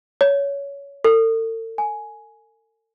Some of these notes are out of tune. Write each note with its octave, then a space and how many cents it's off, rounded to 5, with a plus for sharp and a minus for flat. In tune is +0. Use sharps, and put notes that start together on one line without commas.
C#5 +20
A4 +45
G#5 +10